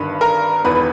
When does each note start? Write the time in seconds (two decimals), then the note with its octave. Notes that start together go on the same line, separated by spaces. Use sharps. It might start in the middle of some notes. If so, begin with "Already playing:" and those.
Already playing: G1 G2 D#3 B4
0.21 A#4
0.64 E1 E2 D#3 B4
0.75 B4